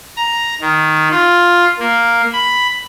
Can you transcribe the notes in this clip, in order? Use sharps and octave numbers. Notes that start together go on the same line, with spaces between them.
A#5
D#3
F4
A#3
B5